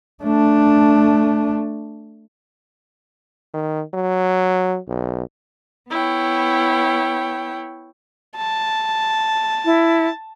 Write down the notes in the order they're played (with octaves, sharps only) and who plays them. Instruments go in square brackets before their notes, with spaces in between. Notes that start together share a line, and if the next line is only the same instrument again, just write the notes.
[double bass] A3 D4
[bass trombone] D#3
F#3
B1
[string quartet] B3 E4 C#5 G5
[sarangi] A5
[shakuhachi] E4